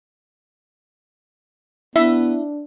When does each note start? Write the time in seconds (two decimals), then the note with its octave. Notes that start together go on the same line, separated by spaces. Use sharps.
1.96 B3 D4 E4 E5